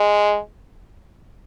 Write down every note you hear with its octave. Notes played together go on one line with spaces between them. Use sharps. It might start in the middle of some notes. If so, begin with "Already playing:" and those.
Already playing: G#3